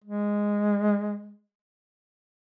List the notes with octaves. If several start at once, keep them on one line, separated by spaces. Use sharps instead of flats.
G#3